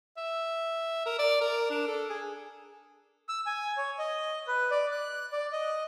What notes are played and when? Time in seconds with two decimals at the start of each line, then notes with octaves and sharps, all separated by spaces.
0.17 E5
1.06 A#4
1.19 D5
1.41 A#4
1.70 D4
1.87 A4
2.10 G#4
3.29 E6
3.46 G#5
3.77 C#5
3.98 D#5
4.47 B4
4.71 D5
4.92 F#6
5.32 D5
5.53 D#5